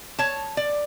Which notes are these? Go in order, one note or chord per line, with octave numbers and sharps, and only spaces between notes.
C#5 A5
D5